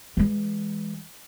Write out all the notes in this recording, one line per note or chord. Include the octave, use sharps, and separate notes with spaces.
E3 G#3